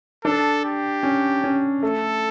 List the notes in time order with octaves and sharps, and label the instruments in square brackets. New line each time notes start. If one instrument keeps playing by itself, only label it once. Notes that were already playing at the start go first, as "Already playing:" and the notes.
[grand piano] D4 [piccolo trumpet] A4
[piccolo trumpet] G4
[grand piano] C#4
C#4
[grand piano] A3 [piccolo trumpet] A4